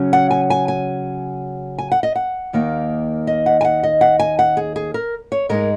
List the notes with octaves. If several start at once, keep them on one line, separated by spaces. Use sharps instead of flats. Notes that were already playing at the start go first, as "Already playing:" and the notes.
Already playing: C#3 F#3 C#4
F#5
G#5
G#5
G#5
G#5
F#5
D#5
F#5
D#2 D#3 A#3
D#5
F#5
G#5
F#5
D#5
F#5
G#5
F#5
G#4
G#4
A#4
C#5
G#2 G#3 D#4 A#4